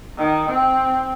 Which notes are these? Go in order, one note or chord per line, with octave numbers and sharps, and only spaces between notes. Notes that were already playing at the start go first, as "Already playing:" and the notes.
D#3
C4